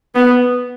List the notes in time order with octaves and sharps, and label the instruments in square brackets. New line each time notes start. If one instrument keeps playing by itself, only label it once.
[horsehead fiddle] B3